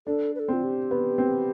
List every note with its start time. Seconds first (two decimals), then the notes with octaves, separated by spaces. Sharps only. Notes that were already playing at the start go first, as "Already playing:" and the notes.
0.07 D4 A4
0.35 B4
0.39 A4
0.48 C4 F4
0.63 G4
0.91 B3
1.18 C4